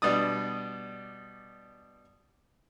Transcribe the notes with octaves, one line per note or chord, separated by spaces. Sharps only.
B2 G3 D4 D5 D#6